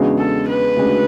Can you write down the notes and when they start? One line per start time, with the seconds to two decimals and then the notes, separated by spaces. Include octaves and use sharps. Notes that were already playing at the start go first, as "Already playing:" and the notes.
Already playing: E2 C#3 G#3 D4 F#4
0.18 A4
0.48 B4
0.77 D2 C#3 G#3 D4 F#4